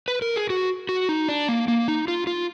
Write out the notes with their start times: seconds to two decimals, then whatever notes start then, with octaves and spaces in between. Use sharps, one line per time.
0.08 B4
0.22 A#4
0.36 G#4
0.50 F#4
0.89 F#4
1.09 D#4
1.28 D4
1.49 A#3
1.68 A#3
1.88 D#4
2.08 F4
2.27 F4